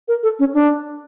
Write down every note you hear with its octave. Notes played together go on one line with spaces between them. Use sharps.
A#4
A4
C#4
D4